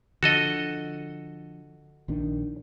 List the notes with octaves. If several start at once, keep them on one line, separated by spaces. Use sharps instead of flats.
D3 F3 F#4 A4 D#5
A#1 D#3 D4